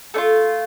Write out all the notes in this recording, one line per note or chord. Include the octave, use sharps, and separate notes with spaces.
A3 D4 F4